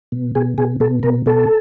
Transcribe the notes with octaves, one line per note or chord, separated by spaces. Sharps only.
B2
B2 G#4
B2 G#4
B2 A4
B2 A#4
B2 A4